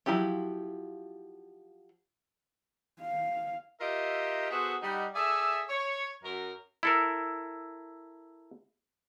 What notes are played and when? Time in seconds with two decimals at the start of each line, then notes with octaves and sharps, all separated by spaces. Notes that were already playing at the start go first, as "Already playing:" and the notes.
0.06 F3 F#3 E4 F4 G4
3.00 F5
3.80 F4 G4 A#4 D#5 E5
4.50 B3 F#4 G#4 A4 C5
4.82 G3 D#4 F#5
5.15 G#4 A4 D5 E5
5.69 C#5
6.23 F#2 A#4
6.83 E4 A4 A#4